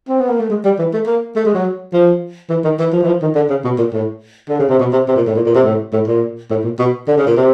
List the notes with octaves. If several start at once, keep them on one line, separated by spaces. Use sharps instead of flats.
C4
B3
A#3
A3
G#3
G3
E3
A3
A#3
A3
G#3
F#3
F3
E3
D#3
E3
F3
E3
F3
D#3
D3
C#3
B2
A#2
A2
D3
C#3
C3
B2
C3
C3
A#2
A2
A#2
A#2
C3
A2
A2
A#2
A2
A#2
B2
D3
C#3
A#2
C3